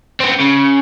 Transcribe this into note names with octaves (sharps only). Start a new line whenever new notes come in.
B3 C4
C#3